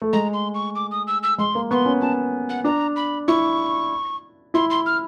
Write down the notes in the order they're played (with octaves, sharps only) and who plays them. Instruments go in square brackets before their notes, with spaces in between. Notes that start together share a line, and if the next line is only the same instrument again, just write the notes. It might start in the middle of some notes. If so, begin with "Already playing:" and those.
[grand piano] A3
[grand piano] G#3 [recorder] A#5
[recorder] C6
C#6
D6
D#6
E6
E6
[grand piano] G#3 [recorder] C6
[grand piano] A#3
[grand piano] B3 [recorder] C#6
[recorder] C6
[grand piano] C#4
[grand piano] C#4 [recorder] A5
[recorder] F#5
[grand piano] D4 [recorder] A#5
[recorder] B5
[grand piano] E4 [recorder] C#6
[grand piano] E4 [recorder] C6
[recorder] C6
F6